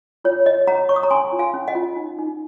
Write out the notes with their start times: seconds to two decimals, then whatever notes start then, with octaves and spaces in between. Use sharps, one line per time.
0.24 F4 C#5
0.46 C#5 D#5
0.67 C#5 F#5 A#5
0.89 C#5 C#6
0.96 D#6
1.03 A#5 C#6
1.11 C#4 G#5 C6
1.32 F4
1.39 F5 G#5
1.54 C#4
1.68 D#5 F#5
1.75 F4
1.96 D#4
2.18 D#4